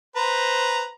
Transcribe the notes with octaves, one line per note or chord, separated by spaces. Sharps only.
B4 C5 A#5